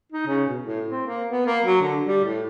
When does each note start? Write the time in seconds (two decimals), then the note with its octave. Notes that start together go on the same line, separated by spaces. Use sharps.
0.12 D#4
0.26 C#3
0.48 B2
0.62 A2
0.88 C4
1.07 A#3
1.30 B3
1.47 A#3
1.64 F#3
1.81 D3
2.06 G3
2.24 A2